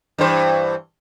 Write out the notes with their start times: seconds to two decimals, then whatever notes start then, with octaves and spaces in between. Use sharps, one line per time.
0.18 G2 E3 C5